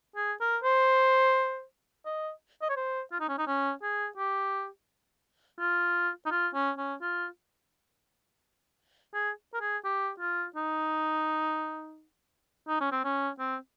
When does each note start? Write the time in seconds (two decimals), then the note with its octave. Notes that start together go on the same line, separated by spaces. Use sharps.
0.16 G#4
0.41 A#4
0.64 C5
2.06 D#5
2.62 D#5
2.70 C#5
2.76 C5
3.12 F4
3.20 D#4
3.29 C#4
3.38 D#4
3.47 C#4
3.83 G#4
4.18 G4
5.60 F4
6.26 D#4
6.31 F4
6.54 C#4
6.78 C#4
7.01 F4
9.14 G#4
9.54 A#4
9.61 G#4
9.85 G4
10.20 F4
10.56 D#4
12.68 D#4
12.81 C#4
12.92 C4
13.04 C#4
13.40 C4